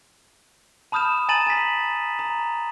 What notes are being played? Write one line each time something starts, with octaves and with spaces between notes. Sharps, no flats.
A5 B5 D#6 F6 G6 E7
G#5 A#5 A6 D#7 E7 F#7
G#5 B6
A#5